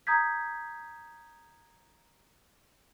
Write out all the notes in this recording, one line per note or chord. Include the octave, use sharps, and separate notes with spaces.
A#5 D#6 G6 G#6 B6